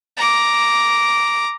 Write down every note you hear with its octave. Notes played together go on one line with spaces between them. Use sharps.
A#5 D6